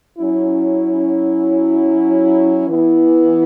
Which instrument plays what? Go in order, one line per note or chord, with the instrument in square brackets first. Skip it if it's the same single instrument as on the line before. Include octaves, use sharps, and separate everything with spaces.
[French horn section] F#3 C#4 E4
E3 B3 E4